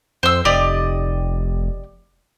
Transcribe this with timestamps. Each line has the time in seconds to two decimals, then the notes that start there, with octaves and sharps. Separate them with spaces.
0.23 F2 C5 E6
0.45 F1 G4 D5 D#5